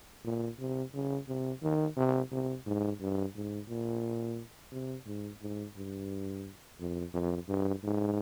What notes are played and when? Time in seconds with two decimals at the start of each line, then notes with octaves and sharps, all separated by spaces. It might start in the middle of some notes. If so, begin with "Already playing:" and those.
0.25 A#2
0.59 C3
0.94 C#3
1.28 C3
1.62 D#3
1.97 C3
2.32 C3
2.66 G#2
3.01 G2
3.35 G#2
3.69 A#2
4.72 C3
5.06 G#2
5.42 G#2
5.77 G2
6.80 F2
7.14 F2
7.48 G2
7.83 G#2